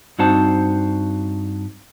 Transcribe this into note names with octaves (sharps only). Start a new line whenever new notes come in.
G2 C4 D#4 F#4 C5 A5